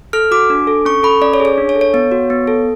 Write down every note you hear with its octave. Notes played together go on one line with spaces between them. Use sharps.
A4 F6
F#4 D6
D4
A4
C#4 C#6
A4 B5
C#4 D5
C#5
G#4
C#5
D4
C#5
A4
C#5
B3 C#5
F#4
B3
A4